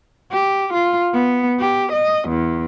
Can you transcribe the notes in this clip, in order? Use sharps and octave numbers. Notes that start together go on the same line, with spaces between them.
G4
F4
B3
G4
D#5
E2